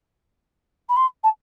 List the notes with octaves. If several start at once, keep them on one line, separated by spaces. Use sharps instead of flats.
B5
C6
A5